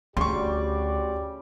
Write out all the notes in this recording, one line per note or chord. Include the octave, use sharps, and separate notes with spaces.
D2 C#3 G3 F#4 G4 D5 C6 C#6